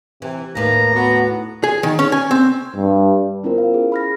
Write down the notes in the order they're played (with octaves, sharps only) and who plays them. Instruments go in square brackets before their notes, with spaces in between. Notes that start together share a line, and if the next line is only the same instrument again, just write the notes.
[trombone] C3 [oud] E3
[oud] D#2 A2 B4 [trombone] A#3 [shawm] A#5
[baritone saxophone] B3 [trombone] F#4
[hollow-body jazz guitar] G#4
D#3
C#4
G#5
C4
[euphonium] G2
[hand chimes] B3 C#4 E4 F4 A#4 C5
F5
G#4
B5 F6 A#6